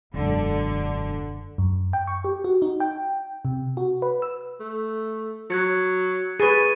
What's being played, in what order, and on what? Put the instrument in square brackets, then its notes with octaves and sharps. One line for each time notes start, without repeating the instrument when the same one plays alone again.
[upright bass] E1 F#2 [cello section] D3
[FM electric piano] F#2
G5
C#6
G4
F#4
D#4
G5
C3
F#4
B4
E6
[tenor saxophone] A3
[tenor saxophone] F#3 [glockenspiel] F#6 G#6 C#7
[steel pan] G#4 B4 [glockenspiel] C#6 A6 D#7